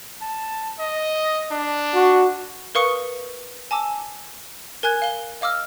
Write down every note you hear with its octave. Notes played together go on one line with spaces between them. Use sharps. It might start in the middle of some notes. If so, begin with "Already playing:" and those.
A5
D#5
D4
F#4
A#4 B4 F5 C#6 D#6 C#7
G#5 A5 D6 E6
A#4 G#5 F#6 G#6
F5 G7
D#5 F5 D6 E6 F6